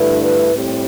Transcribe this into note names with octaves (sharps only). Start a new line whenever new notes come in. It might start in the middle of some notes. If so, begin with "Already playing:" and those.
Already playing: G2 D3 A3 E4 B4
A2 G3 C4 G4